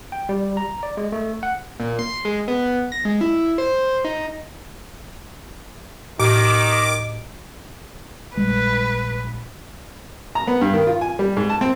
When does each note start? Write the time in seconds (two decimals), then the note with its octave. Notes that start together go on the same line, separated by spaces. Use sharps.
0.12 G5
0.29 G3
0.57 A#5
0.83 D5
0.97 G#3
1.12 A3
1.43 F#5
1.80 A#2
1.99 C6
2.25 G#3
2.48 B3
2.92 A#6
3.05 G#3
3.21 E4
3.58 C5
4.04 D#4
6.20 A2 D#3 D#4 D6
8.37 A#1 G3 G#3 B4
10.35 A#5
10.47 B3
10.61 G2
10.74 D#3
10.87 F4
11.01 G#5
11.19 G3
11.37 G#2
11.50 A5
11.61 C4